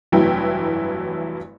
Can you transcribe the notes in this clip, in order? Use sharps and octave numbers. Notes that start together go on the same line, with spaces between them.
F1 G2 E3 F#3 E4 G5